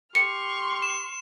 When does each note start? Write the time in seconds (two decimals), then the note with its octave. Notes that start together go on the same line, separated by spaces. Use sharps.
0.15 G4 C6 C#6 F6 C#7
0.82 E7